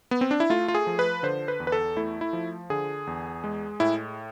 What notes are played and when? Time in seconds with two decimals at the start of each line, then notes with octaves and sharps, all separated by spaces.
0.11 B3
0.21 C4
0.31 D4
0.40 E4
0.50 A3 F4
0.68 F4
0.75 G#4
0.87 F3
0.99 B4
1.23 D3 C5
1.48 B4
1.60 E2
1.67 B4
1.72 A4
1.97 A3 E4
2.21 E4
2.33 F3
2.70 D3 G#4
3.07 E2
3.44 G#3
3.80 A2 E4